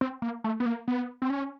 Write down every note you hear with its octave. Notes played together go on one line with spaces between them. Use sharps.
C4
A#3
A3
B3
A#3
B3
C4
C#4